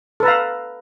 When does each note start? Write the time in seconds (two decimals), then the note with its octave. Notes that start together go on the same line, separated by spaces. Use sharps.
0.20 A4
0.23 B4
0.25 A#5
0.28 F5